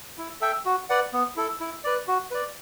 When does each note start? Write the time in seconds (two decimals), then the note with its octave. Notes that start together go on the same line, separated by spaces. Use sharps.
0.18 E4
0.41 A4 E5 G5
0.66 F#4
0.90 B4 D5 F#5
1.13 B3
1.36 E4 A4
1.60 E4
1.84 B4 D5
2.08 F#4
2.31 B4 D5